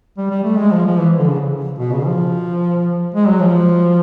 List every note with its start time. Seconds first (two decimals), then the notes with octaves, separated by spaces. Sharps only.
0.18 G3
0.31 G3
0.44 A3
0.58 G#3
0.71 F3
0.86 F3
0.99 E3
1.19 D3
1.29 C#3
1.79 B2
1.92 C#3
2.06 F3
3.15 G#3
3.28 F#3
3.40 F3